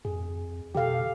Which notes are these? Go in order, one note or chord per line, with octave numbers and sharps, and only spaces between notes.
F2 G#4
B2 G4 A4 F5